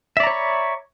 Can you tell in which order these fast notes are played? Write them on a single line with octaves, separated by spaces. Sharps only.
E5 D5 A#5 C#5 B5